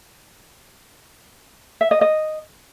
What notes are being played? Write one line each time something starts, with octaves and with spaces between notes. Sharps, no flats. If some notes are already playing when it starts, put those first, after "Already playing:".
E5
D#5
D#5